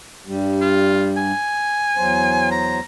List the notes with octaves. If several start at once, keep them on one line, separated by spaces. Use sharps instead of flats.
G2 G3
F4
G#5
E2 F#3 C5
A#5